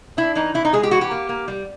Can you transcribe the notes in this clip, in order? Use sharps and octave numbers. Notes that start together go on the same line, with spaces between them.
D4 E4
E3 D#4
E3 E4
D#4
G#3 G#4
G4
E3 F#4
G4
A#3
A#3
G3